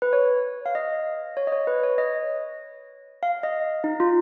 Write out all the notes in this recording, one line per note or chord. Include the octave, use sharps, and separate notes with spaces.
B4
C#5
F5
D#5
C#5
D#5
C#5
B4
C#5
D#5
F5
D#5
D#4
F4